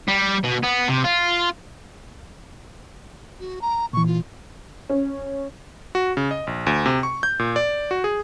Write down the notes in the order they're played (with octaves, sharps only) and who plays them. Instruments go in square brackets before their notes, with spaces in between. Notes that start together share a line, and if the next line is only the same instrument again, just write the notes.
[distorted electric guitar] G3
B2
B3
C3
F4
[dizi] F#4
A#5
[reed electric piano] A#2 E3 [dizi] C#6
[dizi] F4
[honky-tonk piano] C#4
[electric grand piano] F#4
C#3
D#5
A#1
D2
C3
C#6
G6
A#2
D5
F#4
G#4